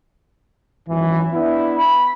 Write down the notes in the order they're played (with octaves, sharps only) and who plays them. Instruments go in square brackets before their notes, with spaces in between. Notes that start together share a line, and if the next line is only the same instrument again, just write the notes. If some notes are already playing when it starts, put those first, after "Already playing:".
[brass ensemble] G#1 F#2 E3
B3 D4 E4
[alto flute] B5